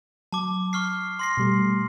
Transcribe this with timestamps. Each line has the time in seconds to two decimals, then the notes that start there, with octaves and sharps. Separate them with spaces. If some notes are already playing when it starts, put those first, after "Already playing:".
0.32 F#3 A5 D6
0.73 C#6 F6 C7
1.19 C6 A#6 C7
1.37 B2 G3 A3